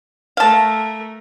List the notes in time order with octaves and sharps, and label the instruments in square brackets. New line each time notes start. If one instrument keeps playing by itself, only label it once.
[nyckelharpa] A3 A#4 [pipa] F5 A5